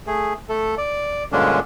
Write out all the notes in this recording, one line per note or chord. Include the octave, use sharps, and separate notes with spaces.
A3 G#4
A3 A4
D5
G2 A#2 D3 G#3 C#4 D4